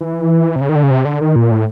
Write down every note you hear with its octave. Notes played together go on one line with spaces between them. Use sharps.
E3
C3
C#3
D#3
D3
C#3
C3
D3
D#3
A#2
A2